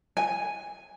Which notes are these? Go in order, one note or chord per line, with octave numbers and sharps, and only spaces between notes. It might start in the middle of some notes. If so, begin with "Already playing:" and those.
G#5